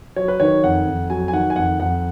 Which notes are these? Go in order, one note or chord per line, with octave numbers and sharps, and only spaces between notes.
F#3 C#5
B4
D#3 C#5
F2 F#5
F2
F#3 G#5
G#5
D#3 F#5
G#5
F2 F#5
F2 F#5